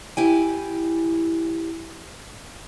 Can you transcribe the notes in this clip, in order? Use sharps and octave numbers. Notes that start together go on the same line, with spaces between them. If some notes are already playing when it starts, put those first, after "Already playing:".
E4 G4 G#5